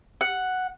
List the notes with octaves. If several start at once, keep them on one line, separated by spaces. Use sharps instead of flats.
F#5